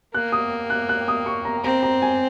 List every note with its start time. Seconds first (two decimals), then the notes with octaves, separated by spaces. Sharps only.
0.14 A#3 F#6
0.32 D#6
0.70 F#6
0.89 F#6
1.08 D#6
1.26 C#6
1.45 A#5
1.64 C4 A#5
1.83 A#5
2.02 G#5